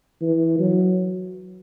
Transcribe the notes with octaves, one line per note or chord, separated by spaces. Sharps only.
E3
F#3